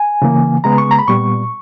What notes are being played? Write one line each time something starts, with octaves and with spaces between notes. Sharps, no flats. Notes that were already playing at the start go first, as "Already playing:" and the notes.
Already playing: G#5
C#3 E3 A#3
C#3 G#3 B3 A#5
C#6
A#5
B5
A#2 G3 B3 C#6